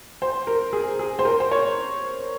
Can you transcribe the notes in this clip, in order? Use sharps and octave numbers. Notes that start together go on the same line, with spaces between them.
C5
A#4
G#4
G#4
C5
A#4
C5
C#5